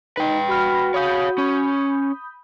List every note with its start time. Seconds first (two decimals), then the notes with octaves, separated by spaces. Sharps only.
0.17 D#4 B4 G5
0.50 F#4 B5 F6 A#6
0.94 C#5 F5 B5 D#6 G6
1.38 C#4